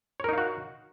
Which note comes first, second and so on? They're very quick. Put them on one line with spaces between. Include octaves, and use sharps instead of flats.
C#5 A#4 D#4 F5 F#4